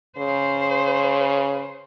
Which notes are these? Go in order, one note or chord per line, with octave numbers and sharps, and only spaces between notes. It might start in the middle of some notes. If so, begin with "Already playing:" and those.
C#3 C5